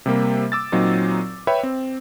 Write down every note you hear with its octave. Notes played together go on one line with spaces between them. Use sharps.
C3 G3 A#3
D6 E6 A6
A#2 F#3 C4 D#4 F4
B4 C#5 E5 G5 B5
C4